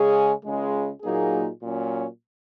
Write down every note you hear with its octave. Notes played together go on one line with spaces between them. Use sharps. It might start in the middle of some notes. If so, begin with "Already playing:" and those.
Already playing: C#3 G#3 C#4 G#4
C#2 C#3 G#3
A#2 F#3 A#3 D#4 G#4
A#2 F#3 C#4